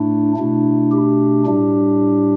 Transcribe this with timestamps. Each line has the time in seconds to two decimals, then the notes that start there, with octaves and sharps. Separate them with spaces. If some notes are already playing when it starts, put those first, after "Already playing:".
Already playing: A2 A3 D4 E4
0.36 B2 A3 D4
0.92 G4
1.46 A2 G3 D4